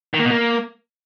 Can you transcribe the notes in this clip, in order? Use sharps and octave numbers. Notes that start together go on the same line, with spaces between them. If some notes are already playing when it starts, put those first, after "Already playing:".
D#3
A#3
B2
A#3